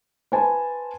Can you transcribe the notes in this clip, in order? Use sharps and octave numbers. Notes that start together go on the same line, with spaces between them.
B4 C5 G#5 A5